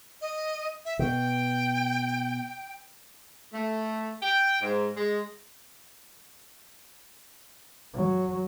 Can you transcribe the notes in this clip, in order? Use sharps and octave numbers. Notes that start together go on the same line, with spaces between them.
D#5
E5
B2 G5
A3
G5
G#2
G#3
F#3